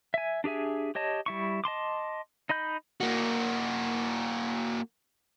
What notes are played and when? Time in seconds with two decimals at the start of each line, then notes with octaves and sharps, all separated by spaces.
0.14 E5 G#5
0.44 D4 G4 G#4 E5 G#5
0.95 G4 C#5 D#5 A5
1.26 G3 E4 C#6
1.64 D#5 A5 C6 D6
2.49 D#4 D#5 B5 G6
3.01 A#3 F#4